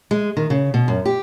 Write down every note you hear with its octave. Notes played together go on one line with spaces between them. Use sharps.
G#3
D#3
C#3
B2
F#2
G4